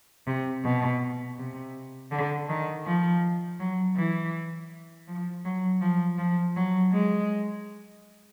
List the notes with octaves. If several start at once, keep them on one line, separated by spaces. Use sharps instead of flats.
C3
B2
C3
D3
D#3
F3
F#3
E3
F3
F#3
F3
F3
F#3
G#3